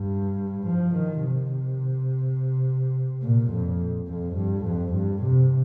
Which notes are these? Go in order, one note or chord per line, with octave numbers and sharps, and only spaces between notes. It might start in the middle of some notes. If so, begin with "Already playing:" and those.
Already playing: G2
F3
D#3
C3
A#2
F2
F2
G2
F2
G2
C3